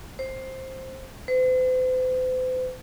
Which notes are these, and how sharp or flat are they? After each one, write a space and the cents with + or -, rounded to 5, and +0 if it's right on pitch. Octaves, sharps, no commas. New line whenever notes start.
C5 +10
C5 -45